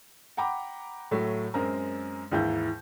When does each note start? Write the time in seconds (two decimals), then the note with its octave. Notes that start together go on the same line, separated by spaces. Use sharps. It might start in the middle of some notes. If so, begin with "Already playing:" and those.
0.37 F#5 G5 A#5 B5 D6
1.11 A2 F#3 A3
1.54 F#2 G#3 C4 A#4 A#5
2.31 D#2 G#2 E3 E4 G6